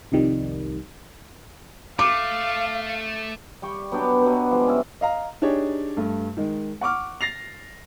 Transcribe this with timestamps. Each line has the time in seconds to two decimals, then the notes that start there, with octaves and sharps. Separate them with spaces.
0.12 C2 F2 D#3 G3
1.99 A3 F5 D6
3.62 G3 G5 C#6
3.92 F#3 B3 D4 G5
4.22 B2 F#3 B4
4.51 F3 G3 G#3
4.67 C#4 E5
5.01 D#5 F5 A#5
5.42 D4 D#4 G4 G#4 C#5
5.97 G2 A3
6.37 D#3 G#3
6.81 F#5 C#6 D6 F6
7.21 A6 A#6 C7 F7